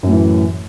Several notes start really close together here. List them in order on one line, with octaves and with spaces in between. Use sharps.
F#2 A2 E3